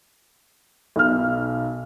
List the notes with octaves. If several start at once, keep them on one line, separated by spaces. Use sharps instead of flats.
B1 B2 F6